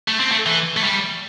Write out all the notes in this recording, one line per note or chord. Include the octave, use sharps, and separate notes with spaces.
A3
C4
A3
E3
A3
G3